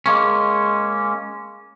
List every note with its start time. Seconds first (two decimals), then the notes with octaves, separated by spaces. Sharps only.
0.06 G#3 A#3 C#4